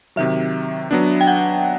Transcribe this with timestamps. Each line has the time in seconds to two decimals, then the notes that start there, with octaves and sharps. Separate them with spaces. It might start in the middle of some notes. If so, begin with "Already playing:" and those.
0.16 C3 D#3 F#3 E5
0.91 F#3 B3 D4
1.21 G5
1.27 F#5